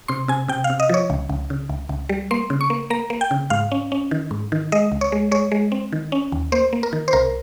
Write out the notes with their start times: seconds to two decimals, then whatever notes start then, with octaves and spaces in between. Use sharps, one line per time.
0.08 C3 C6
0.28 C3 G#5
0.48 C3 G5
0.64 F5
0.70 C3
0.80 D#5
0.89 F3 C#5
1.10 C#2
1.29 C#2
1.50 C#3
1.69 C#2
1.89 C#2
2.09 G3
2.31 A#3 C6
2.50 C#3
2.61 C#6
2.70 A#3
2.90 A#3 A#5
3.10 A#3
3.21 G5
3.31 C#3
3.50 G#2 F5
3.72 C#4
3.92 C#4
4.11 D#3
4.31 G#2
4.52 D#3
4.72 G#3 D#5
4.92 C#2
5.01 C#5
5.12 G#3
5.31 G#3 C#5
5.52 G#3
5.72 C4
5.92 D#3
6.12 C#4
6.32 D#2
6.52 A#3 C5
6.73 A#3
6.83 A#4
6.93 D#3
7.08 C5
7.13 C2 A#4